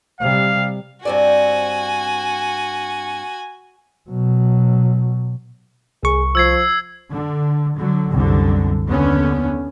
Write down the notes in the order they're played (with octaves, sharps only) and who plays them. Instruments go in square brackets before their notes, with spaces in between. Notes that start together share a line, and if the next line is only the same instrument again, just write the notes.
[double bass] C3 G3 [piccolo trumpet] F5
[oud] G2 C4 D5 [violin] F#4 G#5
[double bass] B2 F#3
[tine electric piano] C2 C#6 [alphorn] G#4
[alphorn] F3 [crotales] E6 G#6 C7
[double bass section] D3
D3 F#3
C2 F#2 D3
D#2 D3 B3 C#4